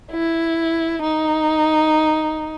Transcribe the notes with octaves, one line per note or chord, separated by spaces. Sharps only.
E4
D#4